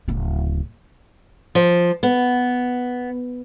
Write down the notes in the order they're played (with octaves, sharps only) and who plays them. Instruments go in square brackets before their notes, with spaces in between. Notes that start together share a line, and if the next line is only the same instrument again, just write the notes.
[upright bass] D1 C#3
[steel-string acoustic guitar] F3
B3